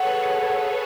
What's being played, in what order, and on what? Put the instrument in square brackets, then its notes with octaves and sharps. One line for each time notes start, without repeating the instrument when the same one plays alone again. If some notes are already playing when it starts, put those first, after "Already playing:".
Already playing: [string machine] G#4 A4 B4 C#5 [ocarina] F#5